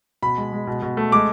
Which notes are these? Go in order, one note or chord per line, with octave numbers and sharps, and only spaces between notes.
B2 B5
G#3
G#3
B2
B2
A3
G#3 D6